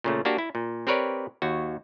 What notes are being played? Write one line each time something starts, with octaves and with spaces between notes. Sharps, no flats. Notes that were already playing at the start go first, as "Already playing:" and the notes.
A#2 C#3 A3
A#3 D4 F#4 G4
E4
A#2
C4 G4 A#4 B4 C#5 D5
D#2 F#4